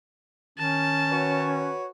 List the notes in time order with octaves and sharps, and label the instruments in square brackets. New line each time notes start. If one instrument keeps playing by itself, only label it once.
[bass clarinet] D#3 [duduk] C#4 [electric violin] A5
[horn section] F#4 B4 C#5